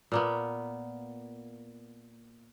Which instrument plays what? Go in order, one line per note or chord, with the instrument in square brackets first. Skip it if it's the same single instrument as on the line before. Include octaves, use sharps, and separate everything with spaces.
[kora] A#2 A#3 B3